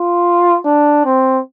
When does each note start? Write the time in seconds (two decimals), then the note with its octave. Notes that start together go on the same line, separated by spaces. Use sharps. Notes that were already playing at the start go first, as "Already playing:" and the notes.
Already playing: F4
0.66 D4
1.05 C4